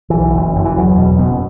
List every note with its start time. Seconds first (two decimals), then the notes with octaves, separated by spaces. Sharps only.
0.10 B1 E3
0.35 F#1
0.56 F#1
0.65 E3
0.77 E2 F#3
0.98 B2
1.19 F#1 B3